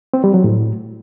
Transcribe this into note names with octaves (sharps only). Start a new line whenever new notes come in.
C4
G3
F#3
A2